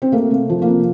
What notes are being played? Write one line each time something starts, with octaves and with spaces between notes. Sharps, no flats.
C4
A3 A#3
C3
F3
A#3
C3